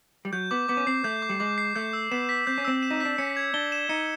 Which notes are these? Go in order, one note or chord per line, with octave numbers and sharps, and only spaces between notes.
G3
F#3 G6
B3 D6
B3 D6
C#4
C4 C7
A3 G6
D6
G3
G#3 D6
C7
A3 G6
E6
B3 E7
B6
C4 G6
C#4
C4 E6
E7
D#4
D4 B6
C#4 C#7
G#6
D4 G7
E7
D#4 C#7